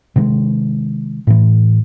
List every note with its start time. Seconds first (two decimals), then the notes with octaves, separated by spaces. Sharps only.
0.16 C3 D#3 G#3
1.27 A2 E3